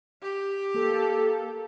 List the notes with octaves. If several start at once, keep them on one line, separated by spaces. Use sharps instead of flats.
G4
A#3 A4